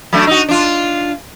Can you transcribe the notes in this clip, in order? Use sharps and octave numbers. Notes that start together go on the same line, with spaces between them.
F#3 A3 D4
D#4 F#4
D4 F4